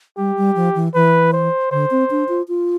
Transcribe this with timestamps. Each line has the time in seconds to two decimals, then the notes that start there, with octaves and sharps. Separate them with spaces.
0.18 G3 G4
0.37 G3
0.56 F3
0.75 E3
0.94 E3 B4
1.33 C5
1.71 D3 C5
1.91 C4
2.11 D4
2.29 F4
2.48 F4